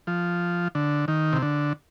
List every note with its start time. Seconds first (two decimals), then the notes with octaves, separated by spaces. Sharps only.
0.07 F3
0.75 D3
1.08 D#3
1.33 C3
1.42 D3